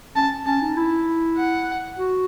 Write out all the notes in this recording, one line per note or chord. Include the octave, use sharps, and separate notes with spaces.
C#4 A5
C#4 A5
D#4
E4
F#5
F#4